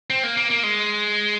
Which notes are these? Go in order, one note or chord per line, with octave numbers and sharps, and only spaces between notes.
C4
A#3
A#3
A#3
G#3